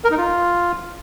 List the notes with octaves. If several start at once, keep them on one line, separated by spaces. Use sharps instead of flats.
A#4
D#4
F4